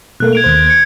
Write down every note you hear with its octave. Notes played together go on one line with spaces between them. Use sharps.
B2 A3 A#3 F#6
G#6 D7 F7
D#2 C5
G#6 C#7